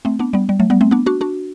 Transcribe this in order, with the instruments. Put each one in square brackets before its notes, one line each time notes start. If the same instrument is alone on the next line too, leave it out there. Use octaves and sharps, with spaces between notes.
[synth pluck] A3 C4
B3 D4
G3 B3
G3
F#3 A3
G3 B3
A3 C4
B3 D4
D4 F#4
D4 F#4